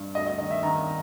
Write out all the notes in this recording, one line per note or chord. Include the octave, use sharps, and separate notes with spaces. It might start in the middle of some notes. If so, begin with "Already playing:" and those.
Already playing: G2
D2 D#5
D#5
D#3 D#5
E5
D#3 A#5